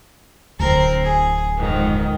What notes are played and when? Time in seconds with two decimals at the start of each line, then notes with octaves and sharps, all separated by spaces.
0.59 D1 D2 C4 A#4
1.03 G#4
1.56 F2 G#2 D#3